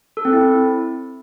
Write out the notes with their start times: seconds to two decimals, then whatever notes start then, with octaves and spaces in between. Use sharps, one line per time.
0.17 A4
0.25 C4
0.33 E4